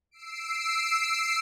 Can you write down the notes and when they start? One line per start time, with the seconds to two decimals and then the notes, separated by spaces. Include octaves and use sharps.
0.11 E6 C7 D7